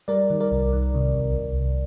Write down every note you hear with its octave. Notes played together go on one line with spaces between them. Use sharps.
G3 A#4 D5
D#3
A#4 D5
C2
D#3
C3
C2
C2
C2